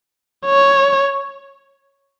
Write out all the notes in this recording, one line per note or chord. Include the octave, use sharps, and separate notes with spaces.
C#5